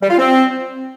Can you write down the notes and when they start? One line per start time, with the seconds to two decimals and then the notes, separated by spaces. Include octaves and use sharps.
0.02 G3
0.10 F4
0.18 C4